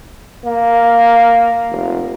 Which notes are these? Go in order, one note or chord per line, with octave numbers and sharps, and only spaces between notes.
A#3
F1